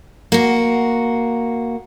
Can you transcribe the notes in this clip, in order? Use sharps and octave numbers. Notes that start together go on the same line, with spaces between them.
A#3 F#4